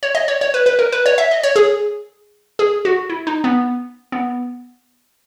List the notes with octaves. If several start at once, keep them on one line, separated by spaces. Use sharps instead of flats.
C#5
D#5
C#5
C#5
B4
B4
A#4
B4
C#5
E5
D#5
C#5
G#4
G#4
F#4
E4
D#4
B3
B3